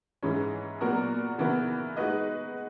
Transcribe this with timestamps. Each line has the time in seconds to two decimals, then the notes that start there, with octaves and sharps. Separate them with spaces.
0.23 G#2 E3 G#3 C#4
0.81 A#2 F#3 B3 F#4 A#4
1.38 C#3 E3 B3 F#4 A#4
1.96 G#3 D#4 F#4 B4 D#5